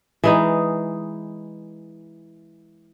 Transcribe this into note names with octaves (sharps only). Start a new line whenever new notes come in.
E3 G#3 D#4